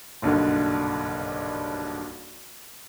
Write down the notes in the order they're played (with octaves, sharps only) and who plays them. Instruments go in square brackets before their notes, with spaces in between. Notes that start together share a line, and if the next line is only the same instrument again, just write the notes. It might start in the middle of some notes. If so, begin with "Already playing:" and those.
[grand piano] F#1 B1 G2 D3